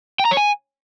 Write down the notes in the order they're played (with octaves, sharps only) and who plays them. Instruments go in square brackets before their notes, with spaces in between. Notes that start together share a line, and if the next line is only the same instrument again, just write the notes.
[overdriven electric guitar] G5
A#5
C#5
G#5